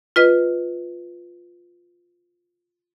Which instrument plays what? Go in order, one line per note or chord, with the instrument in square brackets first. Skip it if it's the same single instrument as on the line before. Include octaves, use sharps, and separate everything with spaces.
[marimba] F4 B4 D#5